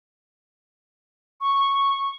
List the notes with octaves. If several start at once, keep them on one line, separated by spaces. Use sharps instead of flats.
C#6